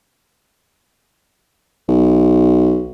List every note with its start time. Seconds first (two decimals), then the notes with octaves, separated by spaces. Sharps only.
1.88 B1